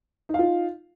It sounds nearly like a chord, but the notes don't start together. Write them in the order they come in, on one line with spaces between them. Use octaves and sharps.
D#4 F5 F4